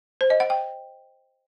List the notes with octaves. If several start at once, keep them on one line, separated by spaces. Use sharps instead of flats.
C5
D#5
F#5
G5